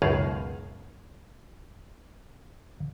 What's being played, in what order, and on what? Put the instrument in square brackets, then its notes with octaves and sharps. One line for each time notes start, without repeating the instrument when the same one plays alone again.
[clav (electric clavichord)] C#2 F#2 B2 D#3 G#4 F5